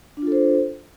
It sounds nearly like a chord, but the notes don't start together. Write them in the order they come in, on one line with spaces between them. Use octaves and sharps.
D4 F4 A4 C5